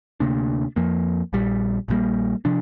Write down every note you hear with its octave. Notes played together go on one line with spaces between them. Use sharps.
D2 C3 A#3 D4
F2 F3 A#3
A#1 A#2 G3
A#1 A#2 G3 A#3
C3 F3 D4